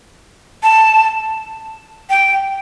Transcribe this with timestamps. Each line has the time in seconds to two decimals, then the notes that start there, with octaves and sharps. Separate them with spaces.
0.63 A5
2.10 G5